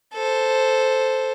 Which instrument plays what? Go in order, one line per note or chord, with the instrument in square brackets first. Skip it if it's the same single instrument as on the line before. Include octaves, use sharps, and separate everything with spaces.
[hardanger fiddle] A4 C5